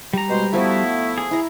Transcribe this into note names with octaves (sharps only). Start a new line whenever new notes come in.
G3 A#5
B2 G#3 C5
F3 A3 B3 E4 F#4
G#4
E4 A#5